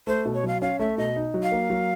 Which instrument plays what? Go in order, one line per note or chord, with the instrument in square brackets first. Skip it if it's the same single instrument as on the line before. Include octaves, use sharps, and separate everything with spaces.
[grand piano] A3 [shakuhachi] C5
[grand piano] B2
[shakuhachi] C#5
[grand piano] F#3 [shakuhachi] F5
[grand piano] C#4 [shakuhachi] F5
[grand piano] A3 [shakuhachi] E5
[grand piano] B2 [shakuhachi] D#5
[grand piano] D#4
F#3
[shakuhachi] F5
[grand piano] A#3
F#3